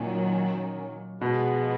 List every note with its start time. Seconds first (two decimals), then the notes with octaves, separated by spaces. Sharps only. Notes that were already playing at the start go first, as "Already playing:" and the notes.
Already playing: A#2 D#3 F#3 C#4
1.21 B2 F3 G#3 B3